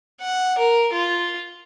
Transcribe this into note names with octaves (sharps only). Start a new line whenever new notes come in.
F#5
A#4
F4